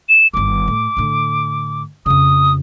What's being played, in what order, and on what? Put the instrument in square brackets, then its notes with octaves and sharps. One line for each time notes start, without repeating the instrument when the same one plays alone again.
[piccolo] E7
[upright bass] G1 D#3 [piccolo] D6
[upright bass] A2
A2 D3
[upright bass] F2 C#3 [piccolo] D#6